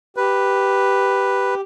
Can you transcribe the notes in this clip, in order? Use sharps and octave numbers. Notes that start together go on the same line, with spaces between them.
G4 B4